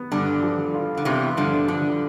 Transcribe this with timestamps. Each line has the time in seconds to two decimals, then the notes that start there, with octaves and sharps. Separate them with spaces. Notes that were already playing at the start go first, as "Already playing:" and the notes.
Already playing: B3
0.12 G2 D3
0.43 F3
0.74 F4
0.97 D3
1.05 C3 E3 B3
1.37 G2 D3 F3
1.68 D3 F3